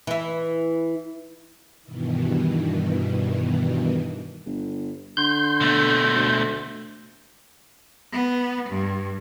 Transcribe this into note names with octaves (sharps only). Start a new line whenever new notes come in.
E3 E4
G2 B2 D#3 E3
G1
D3 C6 G6
B2 A3
D2
B3
G2